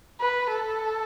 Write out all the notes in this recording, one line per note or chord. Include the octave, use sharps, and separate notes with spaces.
B4
A4